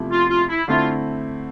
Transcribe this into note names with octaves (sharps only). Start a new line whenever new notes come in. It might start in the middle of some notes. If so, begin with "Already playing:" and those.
Already playing: E2 C3 F3 A3 E4
F4
F4
E4
D3 A3 C4 E4 F4